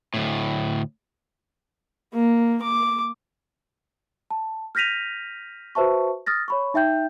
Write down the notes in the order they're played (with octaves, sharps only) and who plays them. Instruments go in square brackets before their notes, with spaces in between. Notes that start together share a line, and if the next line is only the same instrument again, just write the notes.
[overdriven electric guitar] D2 A2
[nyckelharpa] A#3
D6
[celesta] A5
F6 G6 A#6 B6 D#7 F7
F#4 B4 C5 E5 A5 C#6
D#6 F6 A6 A#6
C#5 B5 C#6
D#4 E5 G5 G6